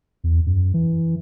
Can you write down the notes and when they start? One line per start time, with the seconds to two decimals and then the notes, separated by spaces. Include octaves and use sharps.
0.24 E2
0.46 F#2
0.74 E3